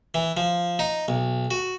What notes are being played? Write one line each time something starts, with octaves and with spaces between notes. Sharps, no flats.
E3
F3
D#4
B1
F#4